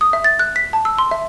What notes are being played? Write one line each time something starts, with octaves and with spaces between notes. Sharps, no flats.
D#6
E5
A6
F#6
B6
A5
E6
C6
E5